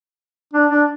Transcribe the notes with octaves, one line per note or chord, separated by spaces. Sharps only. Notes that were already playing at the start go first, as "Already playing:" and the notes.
D4
D4